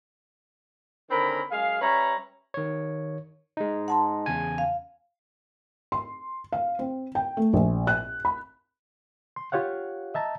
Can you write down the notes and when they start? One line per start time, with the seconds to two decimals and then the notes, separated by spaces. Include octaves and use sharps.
1.10 D3 D#3 C4 C#4 A#4 B5
1.51 F#2 G#3 G#4 F5
1.81 G3 C#4 B4 C#5 E5 A#5
2.54 D#3 C#5
3.57 G#3 D#4
3.88 F#5 A5 C6
4.26 E2 C#3 G#5
4.58 F5
5.92 C6
6.52 F5
6.79 C4
7.15 G5
7.37 A3
7.53 A#1
7.87 F#6
8.25 B5
9.36 C6
9.52 F4 G4 C#5 F5 F#5
10.14 D#5 E5 A5 A#5